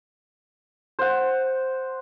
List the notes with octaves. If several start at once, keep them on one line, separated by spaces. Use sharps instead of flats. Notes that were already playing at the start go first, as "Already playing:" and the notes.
C5 F#5